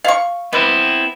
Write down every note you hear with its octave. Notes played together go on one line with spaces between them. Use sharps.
F5 C#6
B3 C4 E4 B4